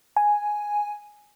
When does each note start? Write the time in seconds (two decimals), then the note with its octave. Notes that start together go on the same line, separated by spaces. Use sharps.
0.17 G#5